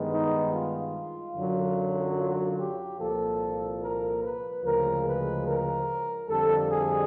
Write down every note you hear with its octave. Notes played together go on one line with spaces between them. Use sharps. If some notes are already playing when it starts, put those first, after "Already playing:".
Already playing: G2 D#3 G#3 B3
D#4
F4
F#2 D3 F#3
F4
G4
C2 A#2 F3 A#3 A4
A#4
B4
D2 C#3 F3 G#3 A#4
B4
A#4
F2 D3 G3 A4
G#4